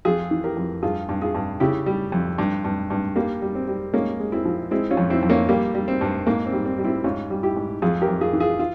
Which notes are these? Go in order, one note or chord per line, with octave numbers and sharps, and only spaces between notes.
F2 F4 G#4
E3
G4 A#4
F2
G2 F4 G#4
G2
F4 G#4
G2
C#3 E4 G4
G3
F2
G2
G2
G2
G3 A#3
G3
C4
G3
G#3 A#3 C#4
G#3
C4 E4
F3
G#3 C4 E4
C#4 F4
F2
C4 E4
F2
A#3 C#4
G3 A#3
G3
C4
G2
G#2 A#3
C4
G3
C4
G3
C4 E4
G#2 C#4 F4
G3
E4 G4
G#2
F2 F4 G#4
G4 A#4
F2
F4 G#4
E3
F4 G#4
F4